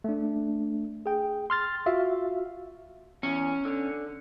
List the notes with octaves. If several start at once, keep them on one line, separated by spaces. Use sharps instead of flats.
A3 D4
G#4 G5
C6 F6 A6
F4 F#4 E5 F5
E2 C#4
D3